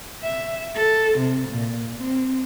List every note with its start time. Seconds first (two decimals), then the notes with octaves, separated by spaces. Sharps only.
0.24 E5
0.76 A4
1.19 C3
1.49 A#2
2.00 C4